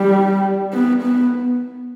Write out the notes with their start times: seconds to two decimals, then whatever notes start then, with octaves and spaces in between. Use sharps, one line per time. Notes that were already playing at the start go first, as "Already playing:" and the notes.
Already playing: G3
0.73 B3
1.02 B3